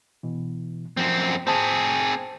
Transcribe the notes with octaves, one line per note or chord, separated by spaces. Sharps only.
B2 E3
F#2 F3 C4
C4 G#4 C5 A5